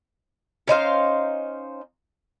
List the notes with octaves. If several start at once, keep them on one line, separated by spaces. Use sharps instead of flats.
C#4 D#4 C5 F5